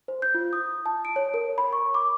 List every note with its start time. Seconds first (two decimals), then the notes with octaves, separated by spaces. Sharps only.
0.08 C5
0.22 G6
0.35 F4
0.53 D#6
0.86 A5
1.05 D7
1.16 C#5
1.34 A#4
1.58 B5
1.72 C#6
1.94 D6